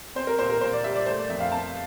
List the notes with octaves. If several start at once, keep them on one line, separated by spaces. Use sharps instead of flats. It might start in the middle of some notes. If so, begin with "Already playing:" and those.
C4 C5
A#4
A#2 C5
A#4
A#2 C5
D5
G3 E5
D5
A3 C5
D5
F2 E5
F5
C4 A5